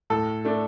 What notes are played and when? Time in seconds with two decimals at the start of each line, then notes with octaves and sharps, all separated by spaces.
0.10 A2 A4
0.45 A3 D4